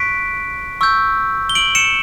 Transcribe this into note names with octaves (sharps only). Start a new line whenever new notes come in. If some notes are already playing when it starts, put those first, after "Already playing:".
Already playing: C#6 F#6 B6 D7
C#6 E6 G6
G7
D7 F#7
C#7 E7